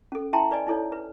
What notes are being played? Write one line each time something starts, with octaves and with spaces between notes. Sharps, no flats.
C#4 A4
E4 E5 G5 A5 A#5 C6
B4 D5 D#5 G#5
D#4 E4 A4 C#5 D5
B4